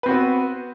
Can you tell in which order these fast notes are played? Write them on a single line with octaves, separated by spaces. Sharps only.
B4 C4 F#4 B3